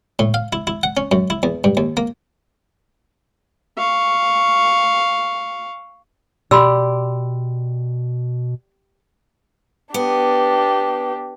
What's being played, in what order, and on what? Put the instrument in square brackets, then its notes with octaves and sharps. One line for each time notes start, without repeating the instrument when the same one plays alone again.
[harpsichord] A2
F5
E4
E4
F#5
C#4
F#2
E4
E2
G2
D#2
A#3
[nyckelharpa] F5 C#6
[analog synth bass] B2 [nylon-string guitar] G4 [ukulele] D5 [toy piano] B5 C6 E6
[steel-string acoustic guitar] B3 [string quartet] D4 G4